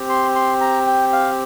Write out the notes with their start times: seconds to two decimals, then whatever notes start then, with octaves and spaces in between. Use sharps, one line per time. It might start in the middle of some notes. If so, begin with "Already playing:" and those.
Already playing: C4 G4
0.09 C6
0.35 C6
0.61 A#5
0.87 G5
1.13 F5